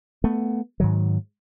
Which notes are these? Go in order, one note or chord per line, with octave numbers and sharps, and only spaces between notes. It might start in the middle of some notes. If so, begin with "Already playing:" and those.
A3 B3
G#2 D#3 F#3